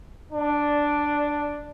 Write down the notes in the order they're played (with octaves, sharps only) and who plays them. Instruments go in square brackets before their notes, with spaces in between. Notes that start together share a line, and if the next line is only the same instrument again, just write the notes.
[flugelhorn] D4